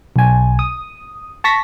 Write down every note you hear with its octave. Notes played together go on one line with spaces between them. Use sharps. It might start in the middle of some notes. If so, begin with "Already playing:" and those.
B1 G#5
D#6
A5 C#6 A#6 B6